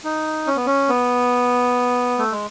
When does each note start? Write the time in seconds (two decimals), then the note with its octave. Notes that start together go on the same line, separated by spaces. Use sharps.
0.04 D#4
0.47 C#4
0.56 B3
0.66 C#4
0.89 B3
2.18 A3
2.32 G#3